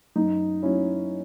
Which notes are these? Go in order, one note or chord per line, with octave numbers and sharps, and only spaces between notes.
F#2 D#4
F#3 C#4 E4